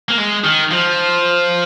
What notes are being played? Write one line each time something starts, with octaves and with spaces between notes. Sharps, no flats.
A#3
G#3
D#3
F3